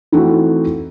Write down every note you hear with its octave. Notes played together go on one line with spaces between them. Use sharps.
E3 A3 C4 D#4 F#4